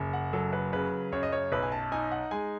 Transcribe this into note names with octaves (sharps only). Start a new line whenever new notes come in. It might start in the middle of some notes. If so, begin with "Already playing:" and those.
Already playing: F#1
F#5
F#3 A4
B4
C#3 B4
F#2 C#5
D#5
C#5
B1 B4
G#5
A5
D#4 G#5
F#5
G#3 G#5